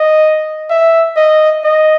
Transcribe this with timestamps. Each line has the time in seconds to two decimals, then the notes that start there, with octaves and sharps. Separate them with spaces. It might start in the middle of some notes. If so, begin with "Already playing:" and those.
Already playing: D#5
0.70 E5
1.17 D#5
1.64 D#5